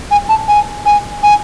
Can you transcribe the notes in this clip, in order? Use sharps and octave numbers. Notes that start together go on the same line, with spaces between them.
G#5
A5
G#5
G#5
G#5